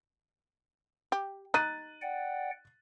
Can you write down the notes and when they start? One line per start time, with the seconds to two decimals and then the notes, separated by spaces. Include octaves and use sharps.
1.12 G4
1.54 D#4 F#6 A6 D#7
2.02 D5 F#5 G5